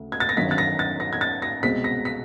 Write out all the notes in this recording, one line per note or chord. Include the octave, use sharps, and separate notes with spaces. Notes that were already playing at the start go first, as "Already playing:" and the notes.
Already playing: D2 C#3
G#6
A6
A#6
G1 F#2 D#3 F#3 B6
A6
A#6
A6
A#6
G#6
A6
A#6
C2 B2 G#3 C4 B6
A#6
B6